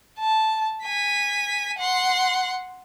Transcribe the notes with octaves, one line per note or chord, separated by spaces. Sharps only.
A5
G#5 B6
F#5 C6